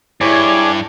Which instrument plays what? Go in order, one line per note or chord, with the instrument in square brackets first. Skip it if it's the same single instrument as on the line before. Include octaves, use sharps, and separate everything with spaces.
[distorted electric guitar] G2 [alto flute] E4 [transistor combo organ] G#4 D5 [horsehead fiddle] C#5